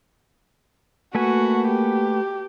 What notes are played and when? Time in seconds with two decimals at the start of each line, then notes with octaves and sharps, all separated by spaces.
1.15 A3 A#3 F#4 B4 G#5
1.68 G4